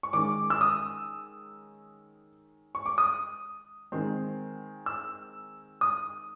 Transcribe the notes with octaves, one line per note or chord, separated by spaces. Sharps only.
C#6
D#3 G#3 C#4 D6
E6
D#6
C#6
D6
D#6
D#3 G#3 C4
E6
D#6